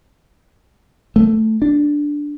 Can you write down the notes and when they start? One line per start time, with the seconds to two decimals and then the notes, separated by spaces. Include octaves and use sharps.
1.16 A3
1.62 D4